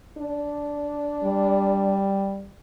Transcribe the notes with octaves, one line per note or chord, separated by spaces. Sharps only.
D4
G3